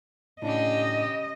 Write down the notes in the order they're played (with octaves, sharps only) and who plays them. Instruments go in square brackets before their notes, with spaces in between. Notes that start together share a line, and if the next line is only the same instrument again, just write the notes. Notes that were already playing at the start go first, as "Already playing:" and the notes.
[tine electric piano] A2 D4 [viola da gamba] C#3 G4 [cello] D#5